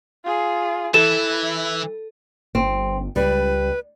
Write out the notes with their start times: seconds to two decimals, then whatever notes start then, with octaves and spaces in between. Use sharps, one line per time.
0.25 F4 G#4
0.94 E3 E4 A4 E7
2.55 G1 C4
3.16 C#2 G3 B4